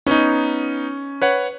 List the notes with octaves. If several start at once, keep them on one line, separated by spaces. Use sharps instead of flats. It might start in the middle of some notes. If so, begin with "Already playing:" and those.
B3 C#4 D#4
B4 C#5 F#5